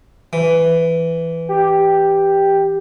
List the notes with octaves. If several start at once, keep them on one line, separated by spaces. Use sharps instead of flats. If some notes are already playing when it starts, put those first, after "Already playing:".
E3
G4